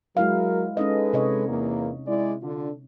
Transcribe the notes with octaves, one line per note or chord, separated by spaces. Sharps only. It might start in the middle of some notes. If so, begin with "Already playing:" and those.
F#3 G#3 E4 A#4 F5
G#3 C#4 D#4 A4 B4 D#5
C3 C#5 D#5
E2 A#3
G#3 E4 D5
D3 D4 F4